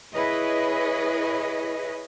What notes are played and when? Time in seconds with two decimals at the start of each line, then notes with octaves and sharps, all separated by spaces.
0.14 E4 G#4 B4 C#5 D#5